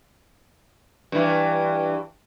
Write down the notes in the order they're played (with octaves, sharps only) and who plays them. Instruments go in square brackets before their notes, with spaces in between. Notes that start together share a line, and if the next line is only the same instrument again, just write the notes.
[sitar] G2 E3